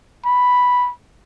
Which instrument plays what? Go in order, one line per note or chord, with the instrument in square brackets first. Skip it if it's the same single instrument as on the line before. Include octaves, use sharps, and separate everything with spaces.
[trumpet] B5